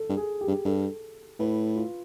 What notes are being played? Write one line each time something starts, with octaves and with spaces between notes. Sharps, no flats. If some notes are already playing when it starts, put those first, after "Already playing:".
Already playing: A4
G2
G#4
G4
G2
G2 A4
A2 B4
F4